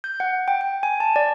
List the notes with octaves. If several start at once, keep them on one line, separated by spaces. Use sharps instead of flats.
G6
F#5
G5
G5
G#5
A5
D5